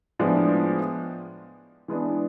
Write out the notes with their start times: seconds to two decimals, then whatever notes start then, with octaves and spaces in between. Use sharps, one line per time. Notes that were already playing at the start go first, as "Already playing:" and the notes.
0.19 A2 F3 G#3 B3 D4
1.88 E3 G#3 B3 D4